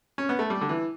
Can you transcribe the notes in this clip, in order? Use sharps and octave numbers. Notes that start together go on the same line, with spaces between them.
C#4
B3
A3
G3
D3
E3